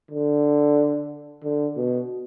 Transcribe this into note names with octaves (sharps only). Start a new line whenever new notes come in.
D3
D3
B2